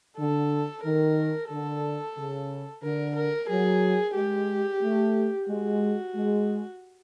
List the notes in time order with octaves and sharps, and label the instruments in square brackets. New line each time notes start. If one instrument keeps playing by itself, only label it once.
[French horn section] D3 [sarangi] A4
[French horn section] D#3 [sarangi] A#4
[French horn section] D3 [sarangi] A4
[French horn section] C#3
[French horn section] D3 [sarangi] A#4
[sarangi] A#4
[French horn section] F#3 [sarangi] G#4
[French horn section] G#3 [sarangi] G4
[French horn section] A3
[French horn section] G#3 [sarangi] F#4
[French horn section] G#3